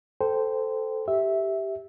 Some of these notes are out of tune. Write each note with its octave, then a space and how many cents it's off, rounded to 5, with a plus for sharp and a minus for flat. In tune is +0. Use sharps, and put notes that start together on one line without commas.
A4 +0 C5 -15 G5 +0
G4 -5 E5 -10